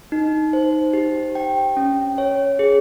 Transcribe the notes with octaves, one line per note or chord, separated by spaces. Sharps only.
D#4
C5
G4
G5
C#4
C#5
G#4